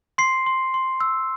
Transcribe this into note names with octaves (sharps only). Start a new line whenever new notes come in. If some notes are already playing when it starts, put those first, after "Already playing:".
C6 C7
C6
C6
E6